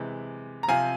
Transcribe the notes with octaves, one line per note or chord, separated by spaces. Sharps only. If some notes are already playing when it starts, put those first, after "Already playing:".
Already playing: C3 E3 G#3
A#5
C3 F3 C4 F5 G#5